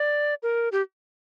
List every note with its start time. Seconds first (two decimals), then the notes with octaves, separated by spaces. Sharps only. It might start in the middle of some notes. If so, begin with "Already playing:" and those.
Already playing: D5
0.43 A#4
0.72 G4